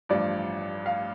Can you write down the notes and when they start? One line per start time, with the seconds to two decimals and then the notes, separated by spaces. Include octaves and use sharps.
0.09 A1 G2 F3 D5
0.86 F5